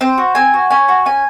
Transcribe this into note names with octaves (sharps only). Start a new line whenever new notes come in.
C4 C5
F#4
C4 G#5
F#4
C#4 G#5
F#4
C#4 G#5